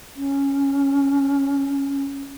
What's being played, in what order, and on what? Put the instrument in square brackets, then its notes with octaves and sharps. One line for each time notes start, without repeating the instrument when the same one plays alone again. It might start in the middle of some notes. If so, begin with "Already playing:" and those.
[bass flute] C#4